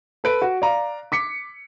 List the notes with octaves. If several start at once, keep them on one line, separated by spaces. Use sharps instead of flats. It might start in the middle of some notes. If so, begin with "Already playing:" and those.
A4 B4 D7
F#4
D5 F5 A#5
D6 B6 C#7